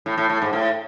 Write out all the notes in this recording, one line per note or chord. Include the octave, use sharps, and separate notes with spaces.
A2
A2
A2
G#2
A2